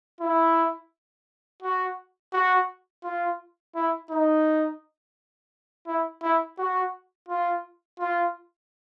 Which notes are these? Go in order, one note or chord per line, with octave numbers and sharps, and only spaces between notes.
E4
F#4
F#4
F4
E4
D#4
E4
E4
F#4
F4
F4